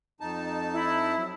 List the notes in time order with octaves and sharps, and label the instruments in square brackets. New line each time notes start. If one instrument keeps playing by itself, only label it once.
[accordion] F2 D#4 A5
[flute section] E4
[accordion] F#3